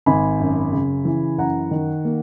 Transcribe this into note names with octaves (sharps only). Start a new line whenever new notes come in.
G#1 G#5 B5
F#2
C#3
E3
F#2 F#5 A#5
D#3
A#3